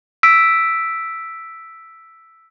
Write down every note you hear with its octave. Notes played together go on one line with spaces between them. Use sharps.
E6 B6 D7